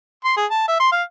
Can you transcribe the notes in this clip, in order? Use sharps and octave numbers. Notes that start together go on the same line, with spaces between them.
C6
G#4
A5
E5
C6
F5